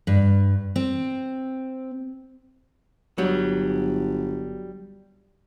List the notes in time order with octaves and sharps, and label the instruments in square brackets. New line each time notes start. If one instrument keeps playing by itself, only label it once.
[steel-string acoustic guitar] G2
C4
[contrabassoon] G1 [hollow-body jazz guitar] F#3 G3